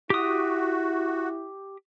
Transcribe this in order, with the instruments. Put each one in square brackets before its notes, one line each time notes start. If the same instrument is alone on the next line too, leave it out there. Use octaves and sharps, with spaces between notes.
[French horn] E4 [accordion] F#4 [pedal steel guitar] G4 D#6